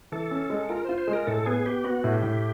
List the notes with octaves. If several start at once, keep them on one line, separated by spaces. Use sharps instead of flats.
E3 A4
C#4
G#3
F4 A#4
C5
F4
C5
G#3
A#4
A2 A4
B3 G#4
B3 G4
B3 F#4
A2
G4
A2